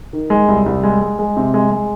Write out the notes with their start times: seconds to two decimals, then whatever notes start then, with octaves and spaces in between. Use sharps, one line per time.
0.13 D#3
0.30 G#3
0.48 C2
0.66 C2
0.83 G#3
1.01 G#3
1.19 G#3
1.37 C3
1.54 G#3
1.71 G#3